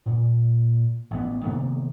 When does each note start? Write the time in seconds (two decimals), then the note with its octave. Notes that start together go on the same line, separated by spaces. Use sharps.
0.06 A#2
1.11 A1 B3
1.44 C3 D#3 A#3 B3